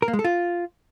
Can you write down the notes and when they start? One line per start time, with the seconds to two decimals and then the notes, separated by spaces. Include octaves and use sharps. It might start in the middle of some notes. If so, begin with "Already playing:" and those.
0.02 A#4
0.08 A#3
0.13 G#3
0.19 A4
0.24 F4